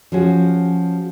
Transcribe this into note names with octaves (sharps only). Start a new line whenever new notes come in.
F3 C#4 F#4 G#4